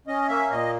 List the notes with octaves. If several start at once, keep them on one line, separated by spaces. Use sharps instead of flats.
C#4 D#5
A#3 E5
A#2 D#5